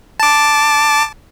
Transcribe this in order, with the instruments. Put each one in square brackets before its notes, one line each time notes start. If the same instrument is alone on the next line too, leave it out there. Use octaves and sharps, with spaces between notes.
[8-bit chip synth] A5 D6